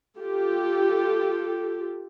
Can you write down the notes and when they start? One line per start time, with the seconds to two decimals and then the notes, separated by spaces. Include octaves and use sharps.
0.18 F4 G4 A4